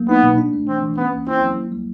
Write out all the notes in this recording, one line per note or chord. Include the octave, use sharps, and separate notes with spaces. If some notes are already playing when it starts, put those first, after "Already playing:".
Already playing: F#3 A#3
B3 D#4
B2
D4
A3
E3 C4
E3
B3 C#4
A#3
C4 E4
F#3
A#3
G3